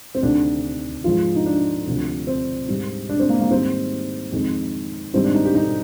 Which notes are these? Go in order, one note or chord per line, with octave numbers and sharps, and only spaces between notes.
C4
D2 C3 D#3 D4
G#2 F3 G#3 F4
D#4
D4
D2 C3 F3
C4
G#2 G3
D4
C4
A#3
A#3
G#2 D#3 G3 C4
F2 D#3 G#3
G#2 D#3 G3 C4
D4
D#4
G4
D#4